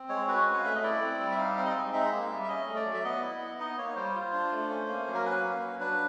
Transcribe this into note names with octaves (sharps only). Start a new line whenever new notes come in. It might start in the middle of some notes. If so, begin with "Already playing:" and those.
Already playing: C4
G#3 C#5
F#4 B4
C#4 F#5
F5
A3 E5
D#5
E4 D5
C4
G3
E5
D#4 F5
C4
D#5
G#3
D#4 E5
A#3
G3
E5
C#4 D#5
A3
D5
F#3
E5
B3 D#5
E4
B3
D#4 D#5
A#3 C#5
G3 C5
F4
D4
A3
C#4
A#3
F#3
A#4
C#4 B4
A#3
F#3
D4 B4